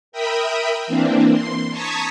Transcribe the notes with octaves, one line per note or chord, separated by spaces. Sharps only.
A#4 E5 G5 B5 D#6
E3 A#3 C4 D4
C6
A5 A#5 C#6 D#6 G#6 B6